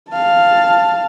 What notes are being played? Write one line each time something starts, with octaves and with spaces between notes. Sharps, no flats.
F5 A5